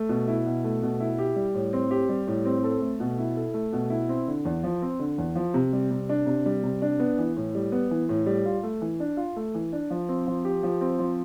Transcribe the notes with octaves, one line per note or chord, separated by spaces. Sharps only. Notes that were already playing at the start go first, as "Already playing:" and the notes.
Already playing: A3
B2
E4
B2
A3
B2
E4
G4
G3
A2
C4
G4
G3
A2
C4
A4
A3
B2
E4
A4
A3
B2
E4
C4
D3
E2
F3
C4
D3
E2
F3
C3
G3
C3
D4
C3
G3
C3
D4
B3
E3
A2
G3
B3
E3
A2
G3
F4
A3
E3
D4
F4
A3
E3
D4
F3
C4
F3
G4
F3
C4
F3